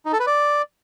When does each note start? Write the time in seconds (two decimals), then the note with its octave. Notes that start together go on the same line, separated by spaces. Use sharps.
0.06 D#4
0.13 A4
0.20 B4
0.27 D5